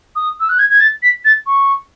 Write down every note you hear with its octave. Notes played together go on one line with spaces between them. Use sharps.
D#6
E6
F#6
G#6
G#6
A6
B6
A6
C#6